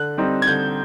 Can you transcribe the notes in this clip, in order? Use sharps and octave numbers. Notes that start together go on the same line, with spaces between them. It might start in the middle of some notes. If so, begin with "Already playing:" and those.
Already playing: D3 F#6
G3 C4 D#4
G#6
D3 G6